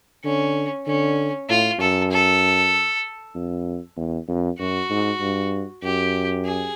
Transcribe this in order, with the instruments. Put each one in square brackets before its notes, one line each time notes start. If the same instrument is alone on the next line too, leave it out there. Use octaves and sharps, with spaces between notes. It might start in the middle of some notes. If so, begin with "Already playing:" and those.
[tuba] D3 [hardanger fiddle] C#4
[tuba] D3 [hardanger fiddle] C#4
[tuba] A2 [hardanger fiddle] F4
[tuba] F#2 [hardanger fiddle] A4
[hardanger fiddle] A4
[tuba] F2
E2
F2
[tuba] F#2 [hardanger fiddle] F#4
[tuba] G#2
G2
[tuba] F#2 [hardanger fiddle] G4
[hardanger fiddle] G#4